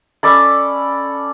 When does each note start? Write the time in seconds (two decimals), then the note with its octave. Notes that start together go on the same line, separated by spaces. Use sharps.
0.23 C#4 A4 D5 B5